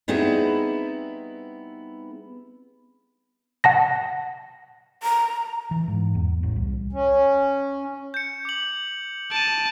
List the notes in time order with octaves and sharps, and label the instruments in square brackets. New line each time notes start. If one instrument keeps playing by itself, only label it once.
[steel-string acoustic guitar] G3 B3 C4 D#4 E4 G#4
[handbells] F#5 A5 A#6
[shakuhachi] A#5
[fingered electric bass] E3
G#2
E2
A1
C2
[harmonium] C#4
[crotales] G6 C#7
D6 F#7
[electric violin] A5 [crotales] D7 D#7